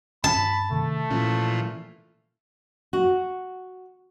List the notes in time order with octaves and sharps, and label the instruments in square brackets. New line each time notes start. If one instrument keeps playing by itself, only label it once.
[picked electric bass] G2 C4 D4 [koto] A5 [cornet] B5
[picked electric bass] C3 D#3 [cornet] A3
[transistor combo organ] A#2 E3 F3 [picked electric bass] C#4
[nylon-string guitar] F#4